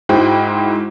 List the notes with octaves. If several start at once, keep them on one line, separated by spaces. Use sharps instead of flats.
G#2 G#3 E4 F#4 C5 G5